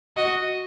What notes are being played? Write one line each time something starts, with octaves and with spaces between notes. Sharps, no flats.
F#4 D#5